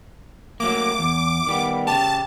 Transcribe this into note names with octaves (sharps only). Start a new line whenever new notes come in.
F#3 A3 A#3 D6
E2
D#3 G3 B3
C#3 G4 A5